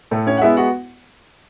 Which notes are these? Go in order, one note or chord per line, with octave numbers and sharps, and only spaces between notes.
A2 A3 A4
C#4 C#5
F#5
G#3 B3 E4 E5
F#4 F#5